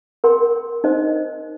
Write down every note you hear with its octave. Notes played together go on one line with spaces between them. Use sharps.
A#4 G5 C6
D#4 C5 D#5